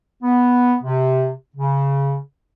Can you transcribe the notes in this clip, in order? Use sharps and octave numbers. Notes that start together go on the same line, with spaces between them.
B3
C3
C#3